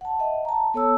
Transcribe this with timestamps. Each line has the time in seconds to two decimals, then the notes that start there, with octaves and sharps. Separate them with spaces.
0.01 F#5 A5
0.20 D#5 E5 F#5
0.45 A5 A#5
0.74 B3 A4 C#5 A5 E6